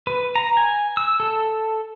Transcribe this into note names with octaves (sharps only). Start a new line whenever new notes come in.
B4
A#5
G#5
E6
A4